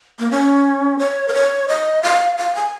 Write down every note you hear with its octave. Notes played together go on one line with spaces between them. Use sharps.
A#3
C#4
C#5
A#4
C#5
D#5
F5
F5
G#5